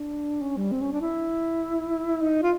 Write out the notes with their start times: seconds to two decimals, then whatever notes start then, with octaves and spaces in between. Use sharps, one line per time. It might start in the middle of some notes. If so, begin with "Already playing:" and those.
Already playing: D4
0.41 C#4
0.57 G3
0.72 C4
0.82 C#4
0.92 D4
1.01 E4
2.22 D#4
2.43 F4